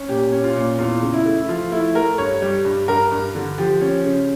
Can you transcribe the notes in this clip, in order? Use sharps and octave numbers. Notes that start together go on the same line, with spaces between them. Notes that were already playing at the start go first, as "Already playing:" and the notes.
Already playing: C#4
A#2 G4
C#4
F4
A#2
E2 F4
C#3
E4
A3
E4
F3 F4
A3 E4
A3 A#4
G2 C#5
G3
G2
G2 A#4
G2
D3
F3 G4
C#4
C#3